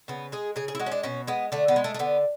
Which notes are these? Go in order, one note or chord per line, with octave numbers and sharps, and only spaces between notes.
C#3 B3
G#3 G#4
C#3 G#4
G#4
E4
G#3 F#4
C#4
D4
B2 C#4
G#3 B3
D3 A3
B3
G#3
A3
A3
D3 B3